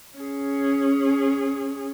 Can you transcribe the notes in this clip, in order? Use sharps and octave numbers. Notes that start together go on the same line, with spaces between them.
C#4 G#4